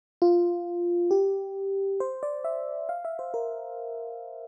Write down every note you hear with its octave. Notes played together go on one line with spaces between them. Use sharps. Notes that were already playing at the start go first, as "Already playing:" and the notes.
F4
G4
C5
D5
E5
F5
E5
C5
A#4